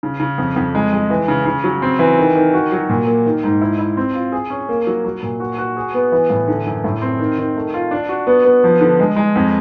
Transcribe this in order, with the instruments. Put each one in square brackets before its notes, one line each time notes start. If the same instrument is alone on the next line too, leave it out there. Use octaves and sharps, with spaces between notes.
[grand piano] C#3
C#3
F2
F2
G#3
G#3
E3
C#3
C#3
F#3
C4
E3
D#3
D#3
F#4
F#3
A#2
A#3
D#3
G#2
E4
E4
C4
F4
G#4
C#4
A#3
F#3
F#3
A#2
F#4
F#4
G#4
B3
E3
A2
D3
F#2
A2
C4
D#3
D#3
A3
F4
D4
F#4
B3
B3
F3
D3
G#3
G#3
F2